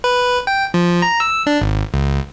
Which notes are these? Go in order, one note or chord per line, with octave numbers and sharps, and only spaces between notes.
B4
G5
F3
A#5
E6
D4
G#1
C#2